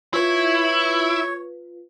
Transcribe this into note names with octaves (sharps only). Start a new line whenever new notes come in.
E4 F4 B4 C#5